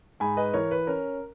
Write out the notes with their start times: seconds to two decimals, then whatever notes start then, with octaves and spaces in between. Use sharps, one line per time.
0.20 G#2 G#5 B5
0.37 B4 D#5
0.53 E3 A#4 C#5
0.71 B4
0.87 C#4 A#4